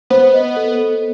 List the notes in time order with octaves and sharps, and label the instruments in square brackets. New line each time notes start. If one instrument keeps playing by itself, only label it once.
[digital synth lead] B3 [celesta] C5
[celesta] D#5
A4
A4